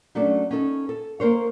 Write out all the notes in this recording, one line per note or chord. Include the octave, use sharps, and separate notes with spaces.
F#3 A3 C#4 D4 A4 D5
C#4 D#4 A4
A4
A#3 A#4 C5 C#5